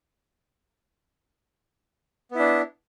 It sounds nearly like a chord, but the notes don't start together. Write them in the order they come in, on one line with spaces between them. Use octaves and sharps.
B3 E4 D4